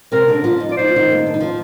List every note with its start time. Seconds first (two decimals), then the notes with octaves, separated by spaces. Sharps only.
0.12 C3 C4 A#4
0.28 D3 D4
0.44 F3 F4
0.60 D#4
0.69 F4 D5
0.76 D#4 C5
0.88 F4
0.96 D#3 D#4
1.12 A#3
1.19 C4
1.27 D4
1.34 D#4
1.40 F3 F4